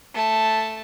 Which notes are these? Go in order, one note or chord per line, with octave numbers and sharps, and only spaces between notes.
A3 A5